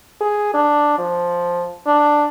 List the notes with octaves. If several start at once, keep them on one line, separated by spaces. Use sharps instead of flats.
G#4
D4
F3
D4